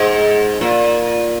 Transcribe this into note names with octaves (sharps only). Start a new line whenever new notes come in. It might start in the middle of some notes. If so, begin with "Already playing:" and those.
Already playing: G#2
A#2